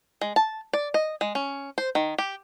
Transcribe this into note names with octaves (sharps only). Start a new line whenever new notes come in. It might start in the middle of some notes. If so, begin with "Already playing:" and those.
G#3
A5
D5
D#5
G#3
C#4
C5
D#3
G4